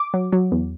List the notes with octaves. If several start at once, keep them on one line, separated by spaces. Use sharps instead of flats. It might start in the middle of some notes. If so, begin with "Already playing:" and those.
Already playing: D6
F#3
F#3
E2